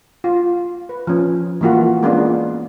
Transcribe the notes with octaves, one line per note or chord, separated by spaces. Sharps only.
F4
B4
F3 C#4
E3 G#3 A#3 F4 F#4
G#3 A#3 B3 C#4 D4 F4